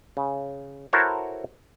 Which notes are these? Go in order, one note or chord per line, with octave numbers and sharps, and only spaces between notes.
C#3
E4 F#4 A4 A#4 C5 C#5